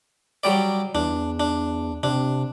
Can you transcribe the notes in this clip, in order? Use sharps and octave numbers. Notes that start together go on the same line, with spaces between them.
F#3 G3 D5
E2 D4
D4
C3 D4